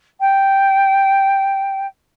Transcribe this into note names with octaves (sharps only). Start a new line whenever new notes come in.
G5